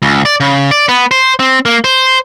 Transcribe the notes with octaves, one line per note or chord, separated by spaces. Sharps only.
C#2
D5
C#3
D5
B3
C5
C4
A#3
C5